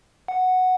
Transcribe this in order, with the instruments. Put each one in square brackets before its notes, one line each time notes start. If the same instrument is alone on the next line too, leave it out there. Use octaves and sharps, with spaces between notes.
[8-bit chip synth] F#5